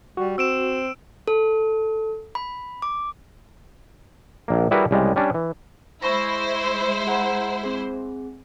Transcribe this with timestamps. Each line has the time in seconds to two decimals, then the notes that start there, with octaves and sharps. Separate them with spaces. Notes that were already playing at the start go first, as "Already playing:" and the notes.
0.17 G3 F#4
0.38 C4 E6 D7 E7
1.28 A4
2.35 B5
2.82 D6
4.48 A#1 A#3
4.71 G3 E4 F#4 G#4 A#4 B4
4.91 C2 C#3 G3 G#3
5.16 G3 C#4 D4
5.34 E3
6.02 G#3 E4 C5 B5 C#6 A#6
7.07 G#4 F#5 A#5
7.63 C4 G#4